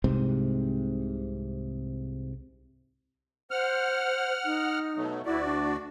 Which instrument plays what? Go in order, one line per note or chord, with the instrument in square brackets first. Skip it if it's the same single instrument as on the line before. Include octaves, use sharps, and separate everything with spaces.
[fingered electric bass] C2 G#2 C3 C4
[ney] C5 [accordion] F#5 F6
[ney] D#4
[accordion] B2 F#3 A3
[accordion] D2 F#4 D5 [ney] E4
[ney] D4